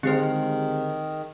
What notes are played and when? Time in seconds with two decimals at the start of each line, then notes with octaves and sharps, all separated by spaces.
0.03 D3 D#3 G#3 C4 G4 C5